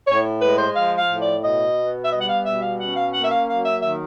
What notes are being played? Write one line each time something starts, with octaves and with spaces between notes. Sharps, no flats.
A2 C#5
G#3 B4
C5
F3 F5
F5
A2
D5
B2 D#5
B3
E5
G3 D#5
F#5
F5
B2 E5
F5
C#4 F#5
F5
A#3 F#5
E5
F5
F#3 F5
E5
D#3 E5